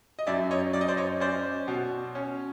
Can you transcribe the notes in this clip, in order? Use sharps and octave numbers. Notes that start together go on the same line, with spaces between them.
D#5
F#2 D5 E5
C#5 D#5
F#2 D5
D#5
C5 D5
C#5 D#5
C#4 C5 D5
B2
C#4